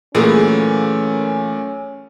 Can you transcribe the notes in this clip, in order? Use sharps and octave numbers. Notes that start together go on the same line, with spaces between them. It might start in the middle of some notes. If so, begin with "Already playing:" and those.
A#2 E3 F#3 A3 A#3 C#4 G#4